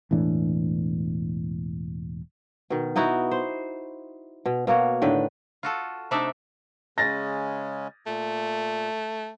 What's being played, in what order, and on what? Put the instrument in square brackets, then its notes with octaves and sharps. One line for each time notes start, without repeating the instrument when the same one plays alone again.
[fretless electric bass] E1 A2 E3 D4
[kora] B2 D#3
B3 D#4 E4 F#4
C5
B2
B2 A#3 F#4 C#5
A2 D3 D#3 B4
[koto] F4 F#4 A4
C3 A3 D4 D#4 D5 E5
[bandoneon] C#3 G#3 C#4 [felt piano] A6 A#6
[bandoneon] A#2 [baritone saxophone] A3